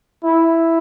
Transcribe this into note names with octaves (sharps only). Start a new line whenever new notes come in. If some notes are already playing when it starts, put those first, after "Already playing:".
E4